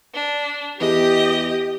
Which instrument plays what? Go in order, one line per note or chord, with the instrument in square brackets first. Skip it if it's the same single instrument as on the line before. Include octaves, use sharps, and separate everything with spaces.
[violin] D4
[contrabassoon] E2 [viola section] G4 [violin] D#5